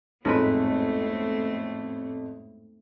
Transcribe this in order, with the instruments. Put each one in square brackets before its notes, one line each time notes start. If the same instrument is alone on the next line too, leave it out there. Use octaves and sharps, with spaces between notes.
[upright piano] A1 F2 [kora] G#2 G#3 B4 [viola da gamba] A3 B3 C4